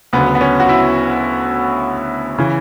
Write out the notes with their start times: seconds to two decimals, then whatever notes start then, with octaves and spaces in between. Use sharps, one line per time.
0.13 D2 C#3 F#3 B3
0.35 B3
0.41 C#4
0.60 F#4
0.69 E4
2.38 C#3 E3